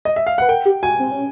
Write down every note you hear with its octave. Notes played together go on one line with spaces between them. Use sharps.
D#5
E5
F5
B4 F#5
A#4 G5
G4
F#4 G#5
C4
C#4